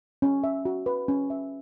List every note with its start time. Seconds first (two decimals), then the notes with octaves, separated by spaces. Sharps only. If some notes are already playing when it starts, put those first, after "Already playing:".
0.22 C#4
0.44 E5
0.65 F#4
0.86 B4
1.08 C#4
1.30 E5